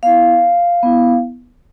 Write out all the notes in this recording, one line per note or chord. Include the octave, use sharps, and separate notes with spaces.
B3 E4 F5
B3 E4